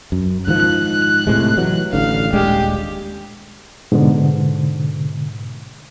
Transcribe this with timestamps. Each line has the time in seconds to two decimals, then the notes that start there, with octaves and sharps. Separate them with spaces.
0.12 F#2
0.47 G#2 D#3 F3 F#6
1.27 A2 C3 G#3
1.57 E3 F#3
1.93 A1 D3 F5
2.33 D#1 G#3 D4 G4
3.92 G#2 B2 D3